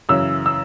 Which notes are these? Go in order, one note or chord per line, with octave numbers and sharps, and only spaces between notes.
F#2 C#3 E3 E6
E6